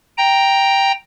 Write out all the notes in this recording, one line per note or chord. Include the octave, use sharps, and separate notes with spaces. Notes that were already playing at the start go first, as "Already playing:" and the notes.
G5 A#5